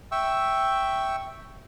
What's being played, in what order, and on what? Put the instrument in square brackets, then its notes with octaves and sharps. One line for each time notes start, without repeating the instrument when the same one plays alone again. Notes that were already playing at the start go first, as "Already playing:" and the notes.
[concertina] E5 G5 C#6 E6